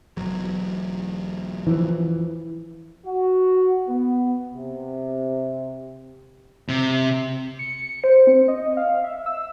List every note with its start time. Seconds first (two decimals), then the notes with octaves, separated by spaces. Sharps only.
0.17 E1 F#3
1.67 E3 F3
3.06 F#4
3.88 B3
4.54 C3
6.69 C3
7.59 C#7
8.04 C5
8.27 C4
8.48 D#5
8.77 F5
9.04 E5
9.26 E6